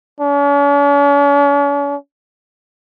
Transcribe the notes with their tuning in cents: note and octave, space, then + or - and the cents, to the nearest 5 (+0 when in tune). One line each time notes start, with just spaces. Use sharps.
C#4 +45